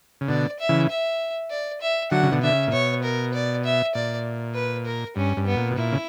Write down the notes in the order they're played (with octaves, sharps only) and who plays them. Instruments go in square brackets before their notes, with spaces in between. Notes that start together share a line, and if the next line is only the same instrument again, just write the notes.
[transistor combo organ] C#3
[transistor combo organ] B2 D3 [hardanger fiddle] D5
[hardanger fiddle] E5
[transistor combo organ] C#3 E3
[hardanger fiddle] E5
D5
E5
[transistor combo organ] D3 F#3 [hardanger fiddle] F#5
[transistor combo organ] C#3
B2 D3
[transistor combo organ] D3 [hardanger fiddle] E5
[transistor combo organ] C#3
A#2
[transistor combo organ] B2 [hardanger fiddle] C#5
[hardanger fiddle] A#4
D5
E5
[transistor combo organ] A#2 [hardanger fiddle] D5
[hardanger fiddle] B4
A#4
[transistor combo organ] G2 [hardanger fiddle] C#4
[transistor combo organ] G2
[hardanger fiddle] B3
[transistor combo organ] A#2
B2
[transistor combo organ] A#2 [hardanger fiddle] E4
[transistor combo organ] C#3